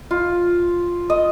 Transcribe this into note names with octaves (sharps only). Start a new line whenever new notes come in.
F4
D#5